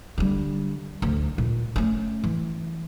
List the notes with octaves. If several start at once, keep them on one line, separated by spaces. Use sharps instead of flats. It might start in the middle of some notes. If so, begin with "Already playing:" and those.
D3 G3
D2
A#2
A3 C#4
E3